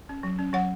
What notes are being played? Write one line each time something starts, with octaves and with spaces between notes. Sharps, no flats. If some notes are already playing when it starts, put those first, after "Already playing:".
C#4
F#3
C#4
F#3 C#5 F#5